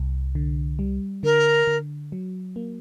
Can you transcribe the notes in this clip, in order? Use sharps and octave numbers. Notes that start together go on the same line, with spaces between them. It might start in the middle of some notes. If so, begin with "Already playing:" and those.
Already playing: C2
D3
G3
D3 A#4
D3
F#3
A#3